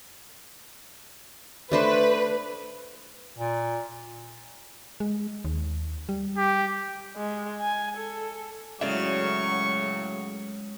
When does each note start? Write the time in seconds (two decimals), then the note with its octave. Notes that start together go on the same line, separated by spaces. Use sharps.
1.72 A3 D4 B4 C5
3.38 A#2
5.00 G#3
5.45 D#2
6.09 G3
6.38 G4
7.16 G#3
7.61 G#5
7.98 A4
8.81 A2 C#3 F#3 G#3 D5 E5 C#6